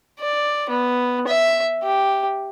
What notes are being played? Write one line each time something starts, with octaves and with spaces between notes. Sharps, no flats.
D5
B3
E5
G4